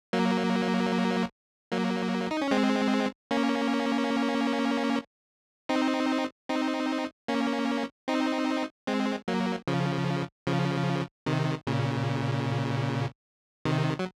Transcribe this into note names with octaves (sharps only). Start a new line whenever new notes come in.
F#3 A#3
F#3 A#3
D#4
C#4
G#3 C4
A#3 C#4
C4 D#4
C4 D#4
A#3 C#4
C4 D#4
G#3 C4
F#3 A#3
C#3 F3
C#3 F3
C3 D#3
A#2 C#3
C3 D#3
F#3